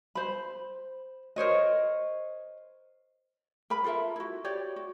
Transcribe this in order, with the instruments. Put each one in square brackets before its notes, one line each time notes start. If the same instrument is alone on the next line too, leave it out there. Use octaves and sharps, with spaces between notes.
[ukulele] C5 B5
A#4 C5 C#5 D#5
A#4 B4 B5
F4 A4 A#4 E5
E4 F#4
F#4 G4 C#5 D5
F#4